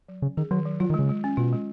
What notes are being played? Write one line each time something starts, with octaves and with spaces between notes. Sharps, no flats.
F#3
C#3 C#4
D#3 G#4
D#3 F#3
F#3
F#3 F4
D#3
C#3 G#3
G#3
C#4
B2 F4
G#3